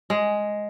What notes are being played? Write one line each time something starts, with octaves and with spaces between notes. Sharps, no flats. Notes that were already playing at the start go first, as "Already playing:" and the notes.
G#3